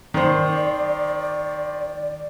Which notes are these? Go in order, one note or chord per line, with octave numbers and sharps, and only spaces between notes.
D#3 C5 D5